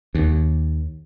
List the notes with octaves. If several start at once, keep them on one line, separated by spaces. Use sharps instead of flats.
D#2